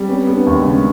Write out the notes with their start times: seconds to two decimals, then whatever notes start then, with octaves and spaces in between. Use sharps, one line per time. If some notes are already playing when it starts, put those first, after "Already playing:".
Already playing: G3 C4
0.08 B3 C#4
0.27 B3
0.34 D4
0.47 D#2
0.59 G#3
0.65 C#3